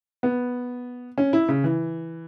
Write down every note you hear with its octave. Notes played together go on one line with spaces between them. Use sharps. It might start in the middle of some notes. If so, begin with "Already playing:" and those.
B3
C#4
E4
C#3
E3